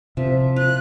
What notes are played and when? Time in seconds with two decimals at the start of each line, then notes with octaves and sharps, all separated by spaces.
0.17 C3 F3 E5
0.56 F4 F#6